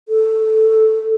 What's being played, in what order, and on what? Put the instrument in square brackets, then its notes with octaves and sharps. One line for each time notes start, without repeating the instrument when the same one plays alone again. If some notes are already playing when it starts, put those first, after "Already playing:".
[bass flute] A4